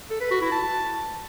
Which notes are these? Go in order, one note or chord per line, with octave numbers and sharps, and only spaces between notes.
A4
B4
F#4
E4
A5